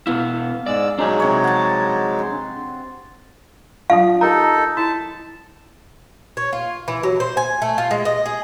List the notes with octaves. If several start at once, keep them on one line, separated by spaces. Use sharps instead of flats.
B2 B3 E4 F5
G#2 G#3 D5 E6
F#3 G#3 D4 D#4 G#4 G#5
C3 C#5
F#5 A5
C6
F#3 D4 F4 F5
D#4 G4 A4 A#4 A#5
E4 A5
C#5
F4
E3
F#3
C5
G#5
A3
F4
G#3
D#5
G#4